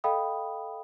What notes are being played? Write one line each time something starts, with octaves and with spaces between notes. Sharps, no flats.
A4 D#5 F5 G5 B5 D#6